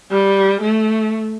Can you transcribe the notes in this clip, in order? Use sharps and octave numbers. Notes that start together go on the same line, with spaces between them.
G3
A3